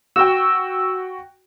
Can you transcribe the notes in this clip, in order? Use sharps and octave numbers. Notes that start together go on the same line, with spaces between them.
F#4 G5 E6